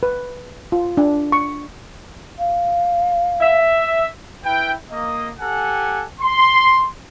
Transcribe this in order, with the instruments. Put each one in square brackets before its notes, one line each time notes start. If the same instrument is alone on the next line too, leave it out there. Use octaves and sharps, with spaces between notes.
[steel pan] B4
F4
D4
C#6
[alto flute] F5
[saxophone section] E5
[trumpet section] E4 B4 G5
A#3 D#5
G4 A4 F#5 G#5
C6